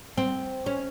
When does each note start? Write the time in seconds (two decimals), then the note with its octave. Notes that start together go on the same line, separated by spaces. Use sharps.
0.18 C4
0.66 C#4